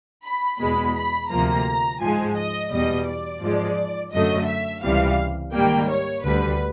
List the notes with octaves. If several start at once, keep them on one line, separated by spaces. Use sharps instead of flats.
B5
E2 B2 G#3 B5
B5
D2 C3 F3 A#3 A#5
G#2 F3 G#3 G#5
D#5
E2 B2 G3 D#5
D5
G#2 F3 G#3
F#2 D3 F#3 A3 D#5
E5
C#2 C3 E3 G3 F5
G#2 D#3 G3 A#3 G5
C#5
D2 D3 G3 B4